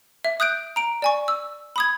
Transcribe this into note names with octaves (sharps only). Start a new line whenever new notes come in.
E5
D#6 F#6 G6 D7
A#5 D7
D5 G#5 C#6
E6
B5 D#6 G#6